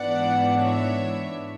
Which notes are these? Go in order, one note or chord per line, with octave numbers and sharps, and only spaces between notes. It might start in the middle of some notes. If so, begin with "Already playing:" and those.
Already playing: G#2 E3 B3 D4 D5 F#5
C#5 E5